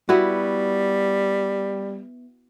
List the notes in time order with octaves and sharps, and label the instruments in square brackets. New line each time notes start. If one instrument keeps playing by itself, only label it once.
[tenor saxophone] G3 [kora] B3 E4 F#4